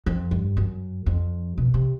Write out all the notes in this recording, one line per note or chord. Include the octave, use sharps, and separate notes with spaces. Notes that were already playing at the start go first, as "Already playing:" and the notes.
F2
G2
F#2
F2
B2
C3